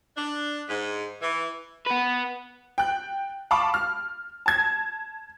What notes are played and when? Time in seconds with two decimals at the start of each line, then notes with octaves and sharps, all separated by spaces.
0.16 D4
0.69 G#2
1.22 E3
1.86 B3 B4
2.78 G5 F#6
3.51 F5 A5 B5 C#6 D6
3.74 F6
4.46 A5 G#6